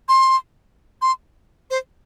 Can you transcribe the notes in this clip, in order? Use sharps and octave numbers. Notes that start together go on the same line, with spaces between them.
C6
C6
C5